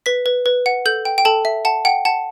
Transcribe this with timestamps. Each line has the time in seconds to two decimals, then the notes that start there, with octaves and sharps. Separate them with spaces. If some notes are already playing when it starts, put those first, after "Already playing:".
0.06 B4 B6
0.26 B4
0.46 B4
0.66 F#5
0.86 A4 G6
1.05 G5
1.18 G5
1.25 A4 A5
1.45 E5
1.65 F#5 A5
1.85 F#5 G5
2.05 F#5 A5